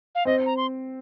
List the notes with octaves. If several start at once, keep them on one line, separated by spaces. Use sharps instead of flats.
F5
C4 D#5
A#5
C6